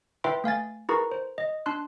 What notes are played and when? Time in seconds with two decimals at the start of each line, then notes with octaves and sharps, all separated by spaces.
0.24 E4 B4 E5 G5 C6
0.44 A3 F5 G#5 A6
0.89 E4 G#4 A#4 B4 A#5 C#6
1.11 C5
1.38 D#5
1.66 D4 A5 C6 F#6